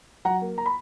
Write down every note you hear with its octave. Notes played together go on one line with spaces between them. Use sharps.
F#3 F#5 A#5
A#3
A#5
B5